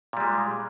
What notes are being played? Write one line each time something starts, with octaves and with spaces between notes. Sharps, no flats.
A#2 G3 G#3